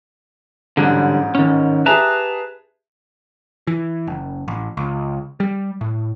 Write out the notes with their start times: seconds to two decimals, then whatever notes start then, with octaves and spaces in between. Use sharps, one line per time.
0.77 A1 G#2 D3 F#3 G3
1.35 D#3 C#4
1.86 G4 G#4 B4 E5 A5 A#5
3.67 E3
4.07 F#1
4.48 A1
4.77 C#2
5.40 G3
5.81 A2